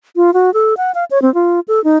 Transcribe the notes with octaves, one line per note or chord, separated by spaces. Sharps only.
F4
F#4
A4
F#5
F5
C#5
C4
F4
A4
D#4